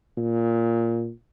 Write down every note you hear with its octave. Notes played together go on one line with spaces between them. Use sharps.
A#2